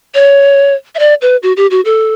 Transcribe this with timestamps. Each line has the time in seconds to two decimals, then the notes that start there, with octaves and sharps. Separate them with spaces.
0.15 C#5
0.95 E5
0.99 D5
1.22 B4
1.43 F#4
1.57 G4
1.71 F#4
1.85 A4